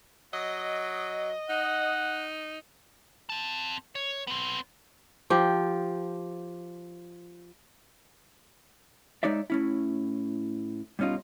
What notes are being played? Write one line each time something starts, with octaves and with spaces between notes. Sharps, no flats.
F#3 D#5
D#4 F#5
C4 A5
C#5
B3 C4
F3 G4
G#3 D#4 C#5 D5 E5
A2 C#4 E4
G2 B2 C#4 D#4 F4